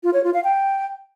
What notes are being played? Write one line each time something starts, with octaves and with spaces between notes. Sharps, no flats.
F4
C#5
F4
F5
G5